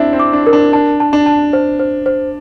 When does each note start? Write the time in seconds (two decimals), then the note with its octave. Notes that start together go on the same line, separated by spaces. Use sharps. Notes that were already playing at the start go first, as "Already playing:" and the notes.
Already playing: C4 D4 E4 E5
0.13 C4
0.19 D6
0.33 D4
0.46 A#4
0.53 D4
0.73 D4 A5
1.00 A5
1.13 D4
1.26 A5
1.53 C5
1.79 C5
2.06 C5